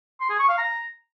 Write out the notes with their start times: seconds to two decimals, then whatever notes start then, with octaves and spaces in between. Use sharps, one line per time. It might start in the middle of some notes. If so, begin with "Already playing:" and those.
0.20 C6
0.30 G#4
0.39 C#6
0.49 F5
0.58 A#5